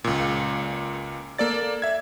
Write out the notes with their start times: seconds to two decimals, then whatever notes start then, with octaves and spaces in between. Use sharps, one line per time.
0.04 C#2 A#2
1.39 A#3 A4 D5 A6
1.82 E5 G#6